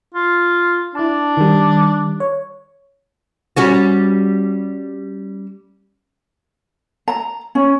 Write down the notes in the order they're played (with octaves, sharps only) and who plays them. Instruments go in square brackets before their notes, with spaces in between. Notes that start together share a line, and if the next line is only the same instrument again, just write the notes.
[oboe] F4
[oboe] D4 [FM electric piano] E4 A5
[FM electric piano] D#3 G3
C#5
[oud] G3 C#4 F#4
[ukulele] A#5
C#4